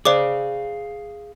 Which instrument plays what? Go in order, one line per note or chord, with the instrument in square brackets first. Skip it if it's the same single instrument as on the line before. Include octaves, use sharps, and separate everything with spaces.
[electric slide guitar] G#4 F5 [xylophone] C5 D5 D6